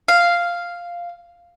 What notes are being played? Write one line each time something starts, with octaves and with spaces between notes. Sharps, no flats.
F5